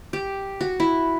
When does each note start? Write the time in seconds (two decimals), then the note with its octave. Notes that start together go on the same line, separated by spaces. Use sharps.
0.13 G4
0.61 F#4
0.80 E4